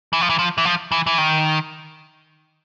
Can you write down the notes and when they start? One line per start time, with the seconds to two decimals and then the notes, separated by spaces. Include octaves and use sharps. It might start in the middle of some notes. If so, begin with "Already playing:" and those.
0.13 E3
0.21 F3
0.30 E3
0.39 F3
0.58 E3
0.65 F3
0.92 E3
1.07 E3
1.18 D#3